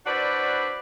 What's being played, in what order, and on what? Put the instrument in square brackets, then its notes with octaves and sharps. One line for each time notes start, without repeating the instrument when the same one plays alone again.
[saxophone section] D4 E4 F#4 B4 C5 D5